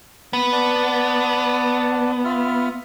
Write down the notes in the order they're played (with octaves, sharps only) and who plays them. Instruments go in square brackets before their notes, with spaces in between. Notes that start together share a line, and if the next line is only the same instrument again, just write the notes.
[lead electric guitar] B3
[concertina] D5 F#5 A5
F4 E5 F6